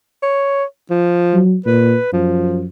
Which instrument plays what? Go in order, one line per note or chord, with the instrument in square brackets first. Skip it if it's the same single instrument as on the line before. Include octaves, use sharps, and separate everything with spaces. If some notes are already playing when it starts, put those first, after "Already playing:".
[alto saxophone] C#5
F3
[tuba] F#3
[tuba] A#2 [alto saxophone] B4
[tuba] F#2 [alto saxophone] F3